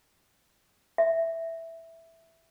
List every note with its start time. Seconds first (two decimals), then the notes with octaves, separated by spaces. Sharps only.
0.98 E5